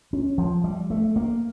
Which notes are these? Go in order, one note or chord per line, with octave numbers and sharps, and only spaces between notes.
C#4
F3
G3
A3
A#3